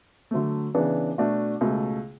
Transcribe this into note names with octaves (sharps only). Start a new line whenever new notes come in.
D3 F#3 A3
C#3 E3 B3 D4
B2 A3 D4 F#4
C#2 B2 A3